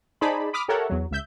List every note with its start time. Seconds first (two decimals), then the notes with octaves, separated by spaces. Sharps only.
0.21 D#4 G#4 C5 D5 A5 B5
0.53 B5 D6 D#6 F6 B6
0.68 G4 A4 A#4 C#5 E5 F#5
0.90 E2 F#3
1.11 C#2 E5 G6